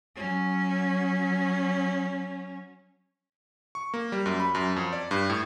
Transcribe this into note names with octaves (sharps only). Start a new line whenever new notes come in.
F#3 C#4
C#6
A#3
G3
F#2
B5
F#2
F2
D5
G2
A2